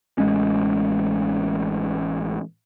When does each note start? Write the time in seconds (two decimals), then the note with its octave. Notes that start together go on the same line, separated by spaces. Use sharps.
0.18 A1 G#3 C#4